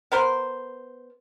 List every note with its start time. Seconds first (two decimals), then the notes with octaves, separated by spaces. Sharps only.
0.12 B3 A#4 C5